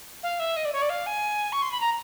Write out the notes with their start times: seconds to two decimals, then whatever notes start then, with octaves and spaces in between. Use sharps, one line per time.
0.23 F5
0.39 E5
0.56 D#5
0.65 D5
0.73 C#5
0.81 D5
0.89 F5
1.06 G#5
1.52 C#6
1.62 C6
1.71 B5
1.80 A#5